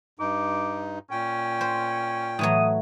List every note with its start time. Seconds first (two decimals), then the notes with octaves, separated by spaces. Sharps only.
0.19 G2 D#4 D6
1.11 A#2 C#4 G5
1.61 C5
2.39 A2 E3 F#3 D#6